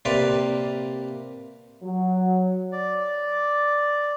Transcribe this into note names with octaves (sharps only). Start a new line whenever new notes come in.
C3 A#3 B4 D5 F5 C6
F#3
D5